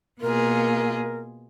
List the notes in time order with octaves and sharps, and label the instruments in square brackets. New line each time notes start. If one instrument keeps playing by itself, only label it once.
[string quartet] B2 A#3 F4 G#4 [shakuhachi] A#4